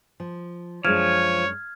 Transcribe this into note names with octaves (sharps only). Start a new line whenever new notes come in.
F3
F#2 F3 G#3 D4 C#5 F6 G#6